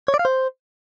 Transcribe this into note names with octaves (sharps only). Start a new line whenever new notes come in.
C#5
D5
F5
C5